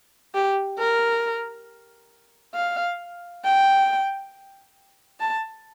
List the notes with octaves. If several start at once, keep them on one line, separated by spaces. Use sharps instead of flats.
G4
A#4
F5
G5
A5